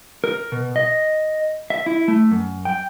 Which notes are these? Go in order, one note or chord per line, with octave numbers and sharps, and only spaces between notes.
A#4
B2
D#5
E5
E4
A3
F#2
G5